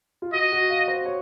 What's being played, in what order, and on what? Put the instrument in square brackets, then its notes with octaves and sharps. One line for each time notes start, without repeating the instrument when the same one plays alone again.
[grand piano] F4
[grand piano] F#4 [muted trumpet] D#5
[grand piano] F#4
F5
C5
C#5